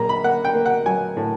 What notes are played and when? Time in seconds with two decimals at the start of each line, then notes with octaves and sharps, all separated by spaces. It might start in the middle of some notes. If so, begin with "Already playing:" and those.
Already playing: A#1 F#3 A#3 A#5
0.09 B5
0.24 A#3 F#5
0.45 G5
0.55 A#3
0.66 F#5
0.86 F#3 G#5
1.17 A2